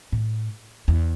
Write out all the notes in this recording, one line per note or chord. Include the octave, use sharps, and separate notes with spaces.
A2
E2